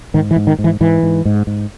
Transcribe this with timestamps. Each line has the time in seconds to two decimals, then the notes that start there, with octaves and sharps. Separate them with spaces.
0.14 G#2 D#3
0.31 E3
0.36 G#2
0.47 D#3
0.59 G#2
0.64 E3
0.81 G#2 E3
1.03 G#2
1.25 G#2
1.47 G#2